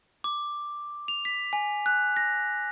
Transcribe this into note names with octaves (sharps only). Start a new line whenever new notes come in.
D6
F7
B6
G#5
F#6
A#6